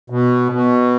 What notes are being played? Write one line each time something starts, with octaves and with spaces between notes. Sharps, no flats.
B2
B2